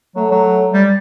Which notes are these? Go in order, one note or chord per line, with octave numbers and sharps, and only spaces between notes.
F#3 A3
F#3
G3